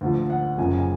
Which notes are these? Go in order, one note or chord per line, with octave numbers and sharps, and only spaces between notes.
D2 D3 F3
F#5
F#1 F#2 C#3 F3 G#5
G#5